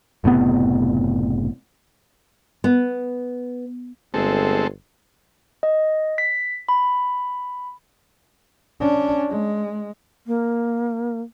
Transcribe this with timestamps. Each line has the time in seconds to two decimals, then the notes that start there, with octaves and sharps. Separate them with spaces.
0.24 F#1 A2 C3 B3
2.64 B3
4.14 G1 G#3 C4 A4
5.63 D#5
6.18 B6
6.69 B5
8.80 C#4 D4
9.30 G#3
10.27 A#3